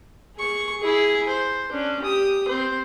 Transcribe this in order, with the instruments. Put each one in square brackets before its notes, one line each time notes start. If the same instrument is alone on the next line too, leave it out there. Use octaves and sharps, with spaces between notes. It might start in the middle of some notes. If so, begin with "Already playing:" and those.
[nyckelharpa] G#4 C#6
E4 G#4
C5
C#4 D4
G4 D#6
C4 C5